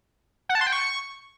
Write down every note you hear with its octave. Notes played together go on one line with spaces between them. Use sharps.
F#5
A5
C6
G5
C#6